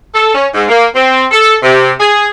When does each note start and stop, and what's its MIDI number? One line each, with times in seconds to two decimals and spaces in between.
0.15 0.34 69
0.35 0.48 61
0.54 0.65 44
0.69 0.87 58
0.95 1.24 60
1.31 1.56 69
1.63 1.93 48
2.00 2.28 68